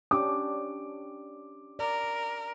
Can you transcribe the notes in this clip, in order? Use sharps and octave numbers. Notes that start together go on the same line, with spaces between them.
C#4 D4 G4 D6
A#4 D5